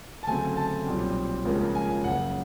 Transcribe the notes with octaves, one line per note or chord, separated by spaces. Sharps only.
A5
D2 C#3 F#3 A3 C4 G#5
A5
B1 A#2 G3 C4
C#2 C#3 F3 A#3 C#4
G#5
F#1 F#2 C#3 F#5